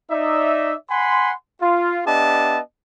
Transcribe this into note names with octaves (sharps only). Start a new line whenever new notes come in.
D#4 D5 E5
F#5 G#5 B5 C6
F4
B3 D4 G4 D#5 E5 A5